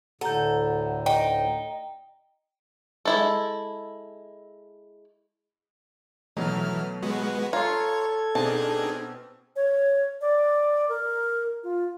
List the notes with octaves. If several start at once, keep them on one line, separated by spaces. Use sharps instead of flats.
D2 A2 D3 A4 F#5 A#5 G6
D#4 G5
G#3 E4 A4
B2 E3 F#3 A3 D#4 F6
G#3 B3 F#4 B4
F4 A4 C#5 A#5 C6 G#6
B2 C4 D4 D#4 G#4 A5
C#5
D5
A#4
F4